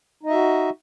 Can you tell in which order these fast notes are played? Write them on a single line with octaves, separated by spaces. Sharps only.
D#4 D#5 E5 F#4